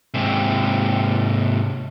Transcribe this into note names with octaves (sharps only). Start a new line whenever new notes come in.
G#2 C3